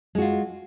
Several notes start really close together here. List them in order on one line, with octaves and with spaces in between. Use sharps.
G#3 F#4 F4